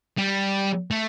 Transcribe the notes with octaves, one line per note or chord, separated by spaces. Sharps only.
G3
A3